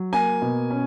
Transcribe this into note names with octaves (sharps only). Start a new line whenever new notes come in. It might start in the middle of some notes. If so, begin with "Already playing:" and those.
Already playing: F#3
A#3 G#5
B2
C#4